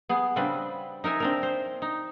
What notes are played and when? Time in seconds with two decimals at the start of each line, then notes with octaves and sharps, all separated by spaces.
0.09 B3 G#4
0.36 C#3 G3 C4 D4 B4
1.04 D#4 A#4 E5 G#5
1.20 C4 D4 A#4
1.43 C5
1.82 D#4